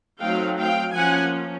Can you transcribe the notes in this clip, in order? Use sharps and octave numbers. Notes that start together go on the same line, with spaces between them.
F#3 A3 C4 D#4 F5 G5
F5 G5
F3 A#3 C#4 F#5 G#5